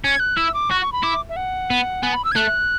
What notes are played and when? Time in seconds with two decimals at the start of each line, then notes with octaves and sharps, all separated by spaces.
0.04 C#4 G#6
0.20 F#6
0.37 E4 E6
0.54 D6
0.70 F#4 C#6
0.81 C#6
0.92 B5
1.03 E4 D6
1.29 E5
1.36 F#5
1.70 B3
2.02 B3 G#5
2.14 B5
2.25 E6
2.32 G#6
2.36 A3 F#6